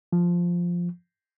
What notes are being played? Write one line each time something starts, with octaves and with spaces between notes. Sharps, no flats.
F3